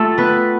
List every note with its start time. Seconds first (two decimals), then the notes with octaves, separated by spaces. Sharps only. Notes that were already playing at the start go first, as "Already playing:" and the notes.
Already playing: A3 F4 G4 A4
0.18 B3 B4